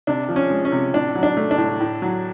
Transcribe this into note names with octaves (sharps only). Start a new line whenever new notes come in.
C3 D4
F3
C#4
G#3
C#4
C3
A2 D4
F#3
D4
A3
D4
A2
A2
F#3